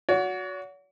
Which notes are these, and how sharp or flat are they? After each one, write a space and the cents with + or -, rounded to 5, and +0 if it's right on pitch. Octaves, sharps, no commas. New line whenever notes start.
F#4 -15 C#5 +45